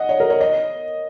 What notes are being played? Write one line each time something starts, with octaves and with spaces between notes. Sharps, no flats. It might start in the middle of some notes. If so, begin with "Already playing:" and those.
Already playing: D#5 F#5
C#5
A#4
C#5
D#5